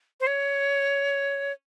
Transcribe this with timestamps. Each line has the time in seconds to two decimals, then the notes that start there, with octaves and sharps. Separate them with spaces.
0.20 C5
0.27 C#5